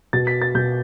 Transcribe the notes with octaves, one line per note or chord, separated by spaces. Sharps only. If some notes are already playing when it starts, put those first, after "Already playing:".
B2 A6
B6
A6
B2 G6